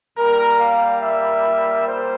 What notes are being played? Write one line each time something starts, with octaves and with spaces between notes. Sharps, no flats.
A#2 G3 A#3 A#4
F5
E5
C5